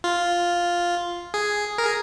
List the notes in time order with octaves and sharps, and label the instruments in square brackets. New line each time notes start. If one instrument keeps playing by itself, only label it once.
[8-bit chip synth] F4
G#4
A#4
G#4